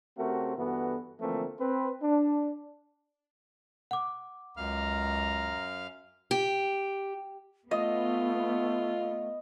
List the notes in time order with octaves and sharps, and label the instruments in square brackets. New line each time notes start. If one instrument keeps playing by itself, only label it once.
[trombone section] C#3 A3 C4 F#4 G4 A#4
G2 E3 B3 F#4 A4
D3 E3 F3 A3 A#3 C4
C4 B4
D4
[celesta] F#5 D6
[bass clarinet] C#2 [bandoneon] F#2 F5 F6 [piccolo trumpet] A#5
[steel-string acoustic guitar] G4
[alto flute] A3 [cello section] B3 [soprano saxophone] F4 [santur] D#5